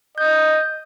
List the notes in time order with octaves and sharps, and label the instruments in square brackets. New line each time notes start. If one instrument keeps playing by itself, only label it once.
[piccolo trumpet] D#5 [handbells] G6